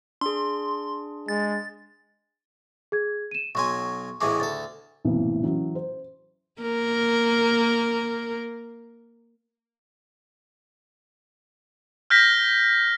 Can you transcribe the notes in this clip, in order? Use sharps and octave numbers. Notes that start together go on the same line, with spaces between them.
D4 G#4 C6
G#3 A6
G#4 G#6
D#7 E7
B1 F#3 G#5 C6 C#6
A1 E3 G#3 C#6 D6
D2 A4 A6
F#1 B1 A2 C3 E3
E3 F#3 C#4
C5
A#3 A#4
F6 G6 A#6 B6